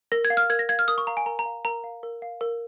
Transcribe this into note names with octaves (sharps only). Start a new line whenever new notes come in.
A#4 A#6
G#6
F5
F6
A#4 G#6
A#6
F5 G#6
F6
A#4 D#6
C#6
F5 A#5
G#5
A#4 A#5
A#5
F5
A#4 A#5
F5
A#4
F5
A#4